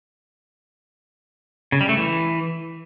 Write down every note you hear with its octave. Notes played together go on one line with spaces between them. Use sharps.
C#3
G3
A3
E3